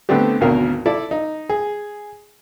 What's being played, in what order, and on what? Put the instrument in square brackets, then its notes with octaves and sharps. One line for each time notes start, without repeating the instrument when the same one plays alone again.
[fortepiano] D3 A3 B3 C4 D4 G4
G#1 D2 B2 A#4 F5
E4 A4 D5
D#4
G#4